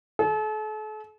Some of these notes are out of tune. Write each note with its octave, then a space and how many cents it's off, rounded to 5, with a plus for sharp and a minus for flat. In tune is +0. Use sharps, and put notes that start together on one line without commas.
A4 -40